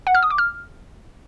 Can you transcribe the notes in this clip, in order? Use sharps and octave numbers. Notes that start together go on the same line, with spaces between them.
F#5
F6
D#6
D6
F6